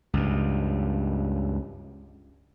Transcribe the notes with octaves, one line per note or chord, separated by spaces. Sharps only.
C#2 G2